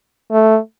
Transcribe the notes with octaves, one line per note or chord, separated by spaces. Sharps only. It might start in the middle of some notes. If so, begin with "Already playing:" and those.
A3